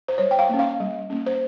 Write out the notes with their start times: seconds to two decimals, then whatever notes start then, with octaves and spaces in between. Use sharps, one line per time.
0.08 C5
0.18 G3 C#5
0.31 G5
0.39 F5
0.49 A#3 C#4
0.59 F5
0.80 G3
1.10 A#3 C#4
1.26 C5